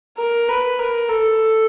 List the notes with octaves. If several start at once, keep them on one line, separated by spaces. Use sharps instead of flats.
A#4
B4
A#4
A4